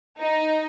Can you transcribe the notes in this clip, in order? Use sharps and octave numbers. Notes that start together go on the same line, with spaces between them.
D#4